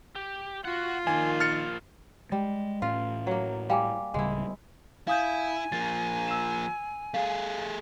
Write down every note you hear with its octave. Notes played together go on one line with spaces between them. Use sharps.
G4
F4 F#4 F#5
D#3 F3 A#3 G#5
F6 A6 C#7
G3 G#3
A2 C#4 F4 F5
F#3 A#3
G3 F5 G#5 D6
D1 C#3 G3 G#3 E4
E4 F5 G#5 D#6 G6
F3 A#3 A6
E6 E7
A3 G#4 F5